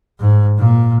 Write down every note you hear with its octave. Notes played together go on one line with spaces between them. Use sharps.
G#2
A#2